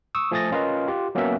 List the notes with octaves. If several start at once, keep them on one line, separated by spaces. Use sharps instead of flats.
C#6 D#6 E6
F3 A3 G#5 D#6 A6 A#6
C#4 F4 A#4 B4 D#5 F5
F4 G4
F#3 A#3 B3 C#4 A#4 E5